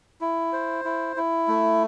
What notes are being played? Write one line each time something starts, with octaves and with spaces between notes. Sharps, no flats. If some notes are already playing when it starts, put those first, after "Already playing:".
E4
C5
E4
E4
A3